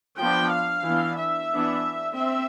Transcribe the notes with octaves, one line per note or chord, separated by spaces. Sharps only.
F3 B3 D4 G5
F5
E3 B3 D4
E5
E3 B3 D4
C4 E5